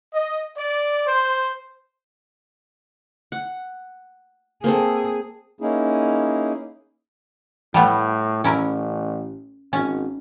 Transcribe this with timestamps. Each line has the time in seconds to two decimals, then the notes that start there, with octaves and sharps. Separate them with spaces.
0.13 D#5
0.56 D5
1.05 C5
3.32 F#5
4.64 A#3 C4 G#4 A4
5.61 A#3 C#4 D#4 E4 G#4
7.74 A2 G3 A3 B3
8.44 A1 C#4 E4 A#4
9.73 G#1 C#4